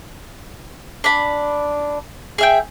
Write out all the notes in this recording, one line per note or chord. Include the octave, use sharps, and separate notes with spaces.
D4 B5
G#4 E5 G5